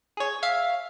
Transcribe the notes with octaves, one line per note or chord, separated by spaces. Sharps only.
G#4 C#5
E5 F5